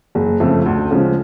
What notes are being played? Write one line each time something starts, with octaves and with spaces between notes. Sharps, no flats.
F#1
F2 C#3 F3 A3
D2
C#3 F3 G#3